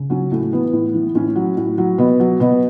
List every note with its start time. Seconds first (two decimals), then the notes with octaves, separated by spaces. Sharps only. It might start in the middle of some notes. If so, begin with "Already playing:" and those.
Already playing: C#3
0.10 F#3 C#4
0.32 A2 A3
0.52 E3 B3
0.73 A2
0.94 E3
1.15 A2 C#4
1.36 F#3
1.57 A2
1.78 F#3
1.98 B2 B3
2.20 F#3
2.40 B2 B3